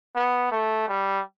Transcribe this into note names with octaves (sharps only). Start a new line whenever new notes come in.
B3
A3
G3